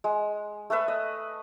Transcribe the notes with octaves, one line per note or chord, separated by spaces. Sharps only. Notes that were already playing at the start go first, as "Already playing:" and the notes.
G#3
A3 A4 B4 E5
D#5